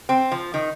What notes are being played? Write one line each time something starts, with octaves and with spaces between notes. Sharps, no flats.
C4
F3
D#3